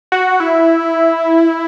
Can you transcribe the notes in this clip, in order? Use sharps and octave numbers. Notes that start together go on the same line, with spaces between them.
F#4
E4